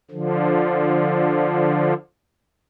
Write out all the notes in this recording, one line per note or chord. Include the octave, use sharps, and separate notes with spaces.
D3 F3